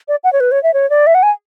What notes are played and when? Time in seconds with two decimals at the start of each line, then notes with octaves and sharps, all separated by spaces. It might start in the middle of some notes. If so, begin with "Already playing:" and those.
0.08 D5
0.24 F#5
0.33 C#5
0.40 B4
0.52 C#5
0.63 E5
0.74 C#5
0.90 D5
1.07 E5
1.15 F#5
1.23 G#5